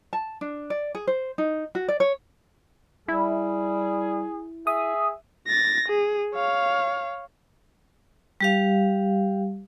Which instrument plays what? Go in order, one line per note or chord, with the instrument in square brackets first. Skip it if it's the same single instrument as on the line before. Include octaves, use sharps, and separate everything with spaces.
[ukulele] A5
D4
D5
G#4
C5
D#4
F#4
D5
C#5
[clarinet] G3 [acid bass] E4 [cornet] G#4
[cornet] G#4 [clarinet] E5 [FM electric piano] D#6
[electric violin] A6 A#6
G#4
C#5 F5
[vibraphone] G3 G4 F5